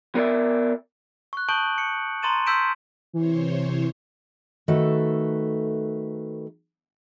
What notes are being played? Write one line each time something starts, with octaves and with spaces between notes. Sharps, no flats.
B3 A#4 C#5 D5 E5
C#6 F#6
A5 C#6 D#6 G6 D7 F#7
C#7
A#5 C6 C#6 A6 D#7 E7
C6 E6 G6 B6 D7 E7
C3 E3 C5 C#5
D#3 A3 F#4 A4 B4 E5